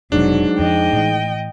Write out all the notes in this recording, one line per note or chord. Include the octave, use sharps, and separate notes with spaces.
F1 G#2 B2 F#3 D4
F2 F3 D#5 G5
A2 E3